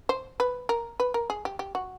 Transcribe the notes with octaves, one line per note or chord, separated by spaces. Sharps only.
C5
B4
A#4
B4
A#4
G#4
G4
G4
F#4